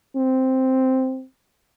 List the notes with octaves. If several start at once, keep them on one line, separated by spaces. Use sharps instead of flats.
C4